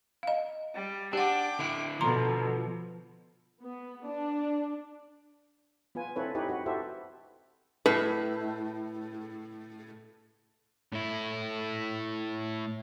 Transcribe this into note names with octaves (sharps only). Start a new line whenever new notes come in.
D#5 F5
G3
D4 G4 F#5 G5 D6
D3 E4
B2 D3 F3 A#5 C6
B3
D4
B3 F4 B4 G#5
C4 E4 A4 B4 C#5
D#4 E4 G4 B4 C#5
F#4 B4
E4 F#4 G4 A4 C5 E5
A2 B4
A2 E4